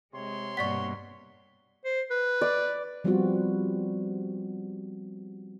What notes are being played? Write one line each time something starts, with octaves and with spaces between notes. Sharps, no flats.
C3 G#3 C#5 C6
G2 B2 A#3 D5 F#5 C#6 B6
C5
B4
D5
F3 G3 B3 C4 F4 F#4